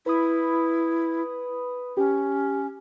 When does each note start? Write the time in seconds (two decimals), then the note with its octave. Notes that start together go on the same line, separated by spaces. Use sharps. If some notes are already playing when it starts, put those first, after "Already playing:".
0.06 E4 B4 B5 D#6
1.97 C#4 G4